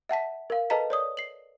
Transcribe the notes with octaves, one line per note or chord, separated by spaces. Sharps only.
E5 F#5 A5 B6
A#4 F5
A4 B4 D#5 A5 A#5 B6
C#5 D5 D#6
C7 F#7